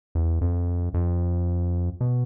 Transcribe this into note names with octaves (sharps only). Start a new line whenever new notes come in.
E2
F2
F2
B2